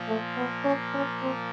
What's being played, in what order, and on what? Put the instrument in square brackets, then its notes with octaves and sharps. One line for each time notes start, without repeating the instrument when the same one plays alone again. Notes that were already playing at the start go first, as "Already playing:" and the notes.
Already playing: [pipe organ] A#2 F3 A#3
[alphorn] A3
B3
C#4
C#4
C4